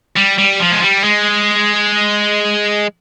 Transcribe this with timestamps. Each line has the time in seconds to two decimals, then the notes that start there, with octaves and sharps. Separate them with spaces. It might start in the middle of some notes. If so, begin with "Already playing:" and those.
0.17 G3
0.39 G3
0.60 F3
0.72 G#3
0.82 G3
1.04 G#3